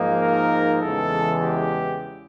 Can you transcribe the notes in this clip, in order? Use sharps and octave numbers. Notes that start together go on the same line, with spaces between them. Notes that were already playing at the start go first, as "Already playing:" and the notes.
Already playing: G#2 F3 A#3 D#4
A#4
E2 C#3 E3 G#3 A4
G4